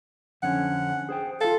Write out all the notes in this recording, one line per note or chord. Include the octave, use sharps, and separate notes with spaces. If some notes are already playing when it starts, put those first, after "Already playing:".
F2 D3 C#4 F#5
G#4 C5 G5
F4 A4 F5